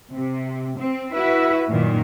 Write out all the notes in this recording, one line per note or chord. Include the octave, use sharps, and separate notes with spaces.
C3
C4
E4 F#4 B4 E5
F#2 A#2 D#3